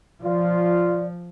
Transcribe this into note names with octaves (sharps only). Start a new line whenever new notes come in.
F3 F4 D5